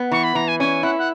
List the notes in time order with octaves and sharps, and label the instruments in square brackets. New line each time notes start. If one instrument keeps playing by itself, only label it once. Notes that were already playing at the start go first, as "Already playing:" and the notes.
Already playing: [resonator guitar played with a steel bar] B3
[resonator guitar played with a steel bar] E3 [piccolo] C#6
[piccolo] B5
[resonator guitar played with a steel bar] E3 [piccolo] A#5
[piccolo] G#5
[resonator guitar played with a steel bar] C#4 [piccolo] G#5
[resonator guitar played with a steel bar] E4 [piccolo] F#5
[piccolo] F#5